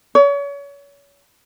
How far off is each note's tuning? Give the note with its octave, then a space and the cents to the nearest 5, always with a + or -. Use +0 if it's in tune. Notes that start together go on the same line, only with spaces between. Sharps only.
C#5 +35